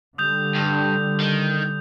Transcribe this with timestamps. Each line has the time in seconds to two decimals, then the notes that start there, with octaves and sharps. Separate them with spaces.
0.18 D3 G3 D#6 G6 F7
0.55 G2
1.20 D#3